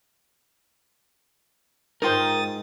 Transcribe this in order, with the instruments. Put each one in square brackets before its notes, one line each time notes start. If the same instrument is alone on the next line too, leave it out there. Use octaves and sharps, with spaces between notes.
[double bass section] G#2 [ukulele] D#4 F4 C5 [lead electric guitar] A#4 G5 [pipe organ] D#6 A6